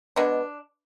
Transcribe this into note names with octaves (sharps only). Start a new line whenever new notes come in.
B2 G#3 B3 D4